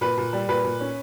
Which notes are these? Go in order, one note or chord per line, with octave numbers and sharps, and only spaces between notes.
A#2 B4
A#2
G3
A#2 B4
A#2
C#4